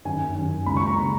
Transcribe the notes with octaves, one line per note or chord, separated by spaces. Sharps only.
F#2 D#3 G#5
F#2 D#3
C#2 C#3 B5
C#6
A#5
C#3